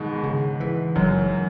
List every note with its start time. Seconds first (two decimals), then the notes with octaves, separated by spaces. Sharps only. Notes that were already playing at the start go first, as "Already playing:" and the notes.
Already playing: G#2 B2 D#3 G#3
0.24 C#3
0.60 E3
0.95 F#1 F#2 F#3